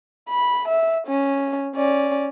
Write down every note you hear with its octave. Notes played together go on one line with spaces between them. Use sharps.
B5
E5
C#4
C#4 D5